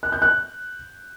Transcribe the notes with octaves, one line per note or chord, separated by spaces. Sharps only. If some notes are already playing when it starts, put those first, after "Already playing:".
F#6
G6
F#6